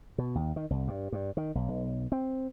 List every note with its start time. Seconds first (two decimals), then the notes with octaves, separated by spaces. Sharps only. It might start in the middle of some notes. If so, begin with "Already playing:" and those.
0.18 B2
0.35 D#2
0.56 D#3
0.70 C2
0.88 G2
1.12 G2
1.37 D#3
1.55 B1
1.68 B1
2.12 C4